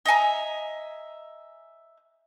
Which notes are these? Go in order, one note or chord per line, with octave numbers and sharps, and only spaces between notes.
D#5 E5 G#5 A#5